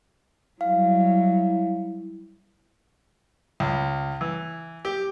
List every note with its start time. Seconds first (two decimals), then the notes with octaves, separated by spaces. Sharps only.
0.61 F#3 G3 E4 F5
3.60 C#2
4.21 E3
4.85 G4